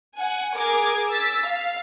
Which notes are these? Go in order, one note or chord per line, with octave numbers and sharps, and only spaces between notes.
F#5 G#5
G#4 A#4 D6 G#6
E6 A6 B6
F5